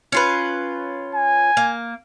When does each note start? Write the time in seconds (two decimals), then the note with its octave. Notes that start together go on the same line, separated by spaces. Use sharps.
0.12 C#4 F4 B4
1.15 G#5
1.57 A#3